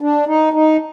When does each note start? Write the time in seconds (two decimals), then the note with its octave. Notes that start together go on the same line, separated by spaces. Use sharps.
0.01 D4
0.27 D#4
0.53 D#4